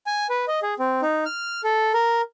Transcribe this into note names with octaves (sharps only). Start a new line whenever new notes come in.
G#5
B4
D#5
G#4
C4
D#4
F6
A4
A#4